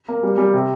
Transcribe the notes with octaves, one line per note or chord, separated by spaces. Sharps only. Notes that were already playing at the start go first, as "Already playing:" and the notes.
A#3
G3
G3
C3